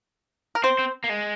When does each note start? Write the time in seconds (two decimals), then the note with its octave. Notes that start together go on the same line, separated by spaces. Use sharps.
0.55 A#4
0.63 C4 C5
0.79 C4
1.04 A#3
1.09 G#3